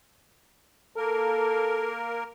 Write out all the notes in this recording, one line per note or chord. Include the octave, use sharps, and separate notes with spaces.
A#3 A4 A#4